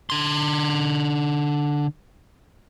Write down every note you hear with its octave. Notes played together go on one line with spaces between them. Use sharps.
D3 C6